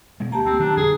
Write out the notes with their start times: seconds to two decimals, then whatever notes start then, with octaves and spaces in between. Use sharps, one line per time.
0.20 B2 G#3
0.32 D2 A#3 G4 A5 A#5
0.46 D2 C4
0.59 D#3 F#3 A3 D4
0.77 F2 D3 F#3 G#4